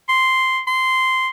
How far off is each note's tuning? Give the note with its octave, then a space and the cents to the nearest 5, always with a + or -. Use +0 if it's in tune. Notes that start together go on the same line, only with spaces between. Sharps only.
C6 -5
C6 -10